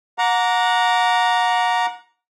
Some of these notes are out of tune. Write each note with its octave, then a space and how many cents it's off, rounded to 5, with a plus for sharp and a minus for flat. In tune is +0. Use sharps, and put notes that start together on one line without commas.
F#5 -30 A#5 +0 D6 -25